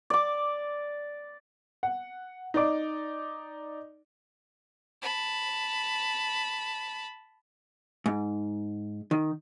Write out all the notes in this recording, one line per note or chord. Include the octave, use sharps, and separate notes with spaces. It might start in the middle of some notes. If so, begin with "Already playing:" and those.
D5 D6
F#5
D#4 D5 D6
A5 B5
G#2
D#3